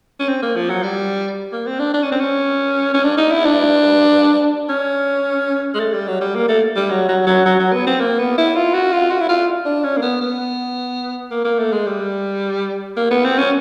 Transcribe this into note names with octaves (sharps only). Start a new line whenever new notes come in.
C#4
C4
A#3
F3
F#3
G3
A#3
C4
D4
D4
C#4
C4
C#4
C#4
D4
D#4
E4
D4
C#4
G#3
A3
G3
F#3
G3
A#3
A3
G3
F#3
F#3
F#3
F#3
F#3
B3
C4
A#3
B3
E4
F4
F#4
F4
F#4
E4
F4
D4
C#4
A#3
B3
B3
A#3
A#3
A3
G#3
G3
A#3
B3
C4
C#4